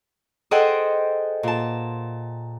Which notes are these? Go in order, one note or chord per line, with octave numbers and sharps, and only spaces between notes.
G#4 A4 C5 D#5 F#5 G5
A#2 A5